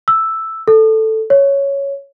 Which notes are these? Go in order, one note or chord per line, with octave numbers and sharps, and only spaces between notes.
E6
A4
C#5